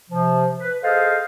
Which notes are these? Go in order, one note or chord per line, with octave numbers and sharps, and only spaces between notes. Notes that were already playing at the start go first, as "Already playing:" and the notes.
C3 F3
B4
G#4 A4 C5 D#5 F5